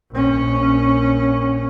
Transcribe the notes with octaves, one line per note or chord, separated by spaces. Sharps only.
A#1 C#4